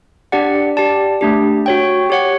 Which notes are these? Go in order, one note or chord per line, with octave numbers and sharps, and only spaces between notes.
D4 G4 D5 F#5
G4 D5 A5
A3 D4 G4
F#4 C#5 G5
G4 C#5 F#5